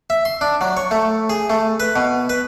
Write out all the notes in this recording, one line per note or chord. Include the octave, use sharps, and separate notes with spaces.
E5
C6
D4
F#3
C#5
A3
G#4
A3
B4
B2
B4